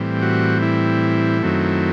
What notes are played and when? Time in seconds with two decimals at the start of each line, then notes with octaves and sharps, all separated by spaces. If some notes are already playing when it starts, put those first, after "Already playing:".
Already playing: A2 E3 G3 C4
0.22 F#4
0.62 E4
1.42 F#2 D#3 F#3 A3 C4